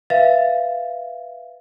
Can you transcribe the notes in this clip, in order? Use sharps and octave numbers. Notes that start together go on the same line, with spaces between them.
B4 E5 F5 A6